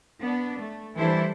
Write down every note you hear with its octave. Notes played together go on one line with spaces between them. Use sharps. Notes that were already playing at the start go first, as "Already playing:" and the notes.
B3 D4
A3
E3 G3 D4 E4 A4 C5